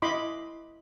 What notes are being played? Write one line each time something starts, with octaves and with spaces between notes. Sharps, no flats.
E4 D#5 B5 C6 D6